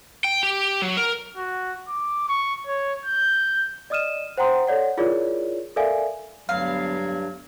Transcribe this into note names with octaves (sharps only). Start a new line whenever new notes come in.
G5
G4
F#3
A#4
F#4
D6
C#6
C#5
G6
D5 D#5 D#6 F6 D#7 E7
C5 F#5 G5 A#5 C6 D#6
A4 C#5 D5 F#5
E4 F4 G#4 A#4 C#5 D5
A4 A#4 D5 E5 F5 G#5
D2 G2 F#3 A3 B3 F5